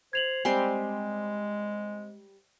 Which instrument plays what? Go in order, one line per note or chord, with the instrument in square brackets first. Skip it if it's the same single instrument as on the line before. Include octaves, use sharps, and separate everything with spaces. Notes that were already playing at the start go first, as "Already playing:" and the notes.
[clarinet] C5 [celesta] G#6 F7 F#7
[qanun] G3 C4 C6 [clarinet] G#3 [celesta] G#5